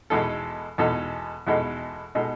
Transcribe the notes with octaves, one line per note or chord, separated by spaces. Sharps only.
E2 B2 G#3 D#4 A4
E2 B2 G#3 D#4 A4
E2 B2 G#3 D#4 A4
B2 G#3 D#4 A4